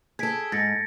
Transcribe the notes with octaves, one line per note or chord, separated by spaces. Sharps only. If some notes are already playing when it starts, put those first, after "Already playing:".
G#4 A4 G#6 B6 D7
G#2 A6 A#6 C#7